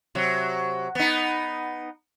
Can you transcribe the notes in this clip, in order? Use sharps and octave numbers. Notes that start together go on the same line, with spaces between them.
C3 F#3
B3 D#4